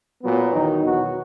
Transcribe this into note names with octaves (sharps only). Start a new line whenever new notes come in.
A#2 F#3 B3
E2 D#3 F#3 D#4
E2 B2 F#3 F#4